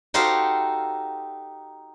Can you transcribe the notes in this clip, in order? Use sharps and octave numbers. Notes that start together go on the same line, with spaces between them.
D#4 F#4 G4 A4 C5 F5